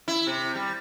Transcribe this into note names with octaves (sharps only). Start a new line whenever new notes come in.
E4
C3
G3